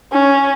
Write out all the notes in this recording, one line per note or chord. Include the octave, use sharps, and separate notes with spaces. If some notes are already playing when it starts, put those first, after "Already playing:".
C#4